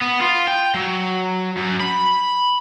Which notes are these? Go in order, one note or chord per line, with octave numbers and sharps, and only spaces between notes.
B3
F4
G5
F#3
F#2
B5